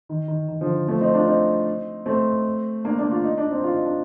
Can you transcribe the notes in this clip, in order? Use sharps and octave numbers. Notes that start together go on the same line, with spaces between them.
D#3
D#3
D#3
D3 F3
F3 A3
C4 D#4
D4 F4
C4 D#4
A3 C4
A#3 D4
A#3 D4
F4
D#4
D4
C4 D#4
F4
D#4
D4